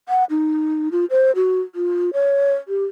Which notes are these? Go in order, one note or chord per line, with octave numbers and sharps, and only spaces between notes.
F#5
D#4
F4
C5
F#4
F4
C#5
G4